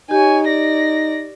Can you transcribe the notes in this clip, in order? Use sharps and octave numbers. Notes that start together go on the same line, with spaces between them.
D#4 G4 C#5 G#5
D5 A#6